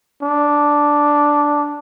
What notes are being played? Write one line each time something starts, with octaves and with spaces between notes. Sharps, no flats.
D4